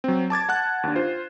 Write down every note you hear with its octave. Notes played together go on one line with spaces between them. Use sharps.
F#3 C4
A5 D6 G#6 A6
F#5 A5 F#6
D#2 D4
F4 C5